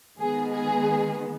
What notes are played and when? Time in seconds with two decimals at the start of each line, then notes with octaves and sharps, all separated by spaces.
0.19 D#3 G#3 B3 G#4
0.52 G#4